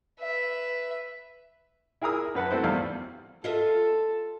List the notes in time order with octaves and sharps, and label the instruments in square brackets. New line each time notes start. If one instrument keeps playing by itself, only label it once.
[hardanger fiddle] B4 E5
[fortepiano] E4 G#4 A#4 A#5 D#6 E6
F#2 B4 F#5 A5
A3 C4 E4 F#4 C5
G#1 E2 G3 F5
[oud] F4 D#5 E5 [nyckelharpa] A4